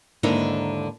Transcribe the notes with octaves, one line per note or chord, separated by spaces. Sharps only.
D#2 G#2 D3 D#4 E4 A#4